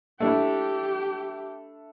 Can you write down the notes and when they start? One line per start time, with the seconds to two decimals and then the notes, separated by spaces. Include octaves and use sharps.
0.20 A3 D4 E4 G4